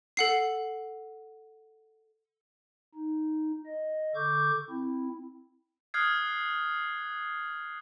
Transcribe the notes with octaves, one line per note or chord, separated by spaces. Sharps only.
A4 F#5 C7
D#4
D#5
D3 A4 C#6 D6 G6
C4 E4
D#6 F6 F#6 G#6 C7